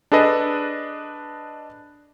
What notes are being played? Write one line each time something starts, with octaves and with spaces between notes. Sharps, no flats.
D4 G#4 A4 B4 D#5